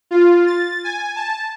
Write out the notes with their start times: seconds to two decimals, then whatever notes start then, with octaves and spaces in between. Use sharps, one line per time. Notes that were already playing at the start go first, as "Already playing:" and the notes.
0.11 F4
0.46 A6
0.84 G#5
1.16 A5